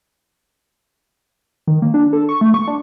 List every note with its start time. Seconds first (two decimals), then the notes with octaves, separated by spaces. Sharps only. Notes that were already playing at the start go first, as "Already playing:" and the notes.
1.67 D#3
1.82 A#3
1.94 D4
2.13 A4
2.29 C#6
2.41 A3
2.54 C#6
2.68 D4